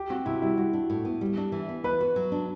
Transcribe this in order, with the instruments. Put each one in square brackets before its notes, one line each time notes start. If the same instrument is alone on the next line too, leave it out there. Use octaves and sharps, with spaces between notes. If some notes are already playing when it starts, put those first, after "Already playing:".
Already playing: [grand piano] G4
[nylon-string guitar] C4 [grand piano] F#4
[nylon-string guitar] C3 [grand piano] E4
[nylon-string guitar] G3 [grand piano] E4
[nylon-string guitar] G3 [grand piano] F#4
[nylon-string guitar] D4
A2
B3
G3
D4
E3
B3
[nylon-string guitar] B3 [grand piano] B4
[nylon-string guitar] F#4
F#3
D4